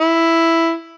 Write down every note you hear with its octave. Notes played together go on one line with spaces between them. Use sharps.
E4